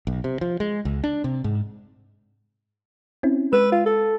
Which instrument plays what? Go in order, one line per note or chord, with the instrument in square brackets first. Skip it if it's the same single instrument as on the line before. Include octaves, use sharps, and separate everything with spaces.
[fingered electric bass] B1
C3
F3
G#3
C#2
D4
C3
G#2
[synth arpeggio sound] C4 C#4 E4
[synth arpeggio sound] G#3 E6 [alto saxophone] B4
[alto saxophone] F4
A4